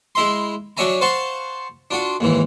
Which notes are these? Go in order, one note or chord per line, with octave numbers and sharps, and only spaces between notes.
G#3 E4 E5 A#5 C6
F#3 D4 C#5 E5 G#5 A#5
C5 F5 F#5 A5 C6 C#6
D4 F4 F#4
D#2 G#2 E3